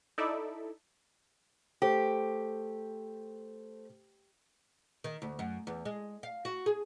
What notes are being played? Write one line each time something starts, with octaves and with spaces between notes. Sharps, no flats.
D#4 E4 A4 D5 E5
A3 G4 C5
D#3
D2
F#2
E2
G#3
F5
F#4
G#4